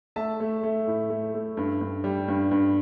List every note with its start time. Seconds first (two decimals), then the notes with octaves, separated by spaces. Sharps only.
0.16 A3 E5 A5
0.40 A3
0.63 A3
0.87 A2
1.10 A3
1.34 A3
1.57 G2
1.81 G2
2.04 G3
2.28 G2
2.51 G2